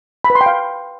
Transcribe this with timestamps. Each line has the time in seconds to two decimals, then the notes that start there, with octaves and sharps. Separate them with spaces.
0.24 B5
0.30 B4
0.35 C6
0.41 G5
0.46 F5